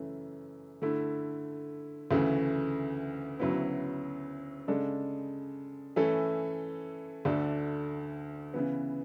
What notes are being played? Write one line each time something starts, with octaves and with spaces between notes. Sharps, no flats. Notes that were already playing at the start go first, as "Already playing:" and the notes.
Already playing: F#2 C#3 E3 A3
D3 A3 E4
D2 C#3 E3 A3
D2 C#3 F#3 B3 E4
C#3 G#3 D4 A4
E3 A3 C#4 E4 A4
D2 D3 A3 D4 A4
C#3 E3 B3